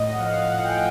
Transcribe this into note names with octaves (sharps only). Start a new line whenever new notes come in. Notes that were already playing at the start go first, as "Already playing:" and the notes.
Already playing: A2 D#5
F#5
F3 F5
F5
A2 F#5
G5
G#5